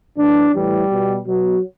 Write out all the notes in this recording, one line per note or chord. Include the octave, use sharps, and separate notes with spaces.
A2 E3 D4
A2 E3 G3
B2
B2 F#3